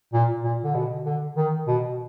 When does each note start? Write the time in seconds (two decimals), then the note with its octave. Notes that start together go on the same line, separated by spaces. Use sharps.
0.13 A#2
0.44 A#2
0.64 D3
0.75 B2
1.06 D3
1.37 D#3
1.67 B2